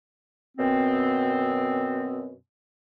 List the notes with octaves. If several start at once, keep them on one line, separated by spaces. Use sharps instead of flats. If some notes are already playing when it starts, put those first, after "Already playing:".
F#2 B2 B3 C4